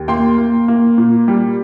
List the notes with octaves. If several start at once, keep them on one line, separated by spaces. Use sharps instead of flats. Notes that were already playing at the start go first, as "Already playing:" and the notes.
Already playing: D#2
A#3 G5 C6
A#3
A#3
A#2
G3